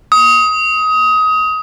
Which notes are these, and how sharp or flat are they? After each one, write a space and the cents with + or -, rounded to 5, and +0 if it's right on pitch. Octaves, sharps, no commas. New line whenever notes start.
D#6 +20